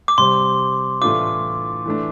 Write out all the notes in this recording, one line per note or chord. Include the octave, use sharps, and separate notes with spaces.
D6
C3 G3 C4 C6
A2 E3 A3 D4 F4 D6
E3 A3 D4